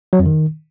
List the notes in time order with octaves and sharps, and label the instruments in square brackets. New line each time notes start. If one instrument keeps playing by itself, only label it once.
[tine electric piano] F#3
F2
D#3